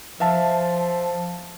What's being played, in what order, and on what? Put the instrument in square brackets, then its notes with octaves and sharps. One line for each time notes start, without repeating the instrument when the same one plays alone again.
[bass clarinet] F3 [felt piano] E5 F5 A5